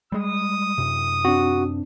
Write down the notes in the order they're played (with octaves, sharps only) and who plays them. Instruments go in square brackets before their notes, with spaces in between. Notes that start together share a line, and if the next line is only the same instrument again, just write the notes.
[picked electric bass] G3 G#3 [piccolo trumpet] D#6
[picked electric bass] F#2 C3
[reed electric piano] C4 D4 [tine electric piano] F#4